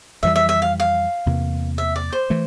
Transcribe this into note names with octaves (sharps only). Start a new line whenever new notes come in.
F2 E3 G3 E5
E5
E5
F5
F5
E2 C3 E3 A#3
E5
D5
C5
E3 A3